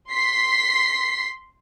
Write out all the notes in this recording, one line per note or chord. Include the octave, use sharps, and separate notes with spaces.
C6 B6 C7